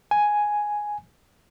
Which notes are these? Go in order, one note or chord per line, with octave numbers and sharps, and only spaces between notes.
G#5